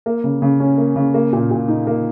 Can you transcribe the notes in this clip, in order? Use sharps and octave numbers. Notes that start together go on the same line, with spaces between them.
A#3
C#3
C#3
C#4
A#3
C#3
A#3
A#2
A#2
D#4
A#3